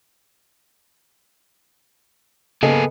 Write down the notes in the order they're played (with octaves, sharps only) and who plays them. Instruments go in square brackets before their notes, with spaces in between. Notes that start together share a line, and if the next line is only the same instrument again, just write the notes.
[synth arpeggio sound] C#3 D#5 [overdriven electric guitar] A#3 G#4 [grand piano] B3 A4